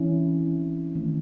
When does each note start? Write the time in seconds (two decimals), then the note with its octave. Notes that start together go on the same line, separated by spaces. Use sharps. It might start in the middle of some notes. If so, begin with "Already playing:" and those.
Already playing: E3 C4 C#4 E4
0.42 E3 C4
0.95 D#3 A3 C4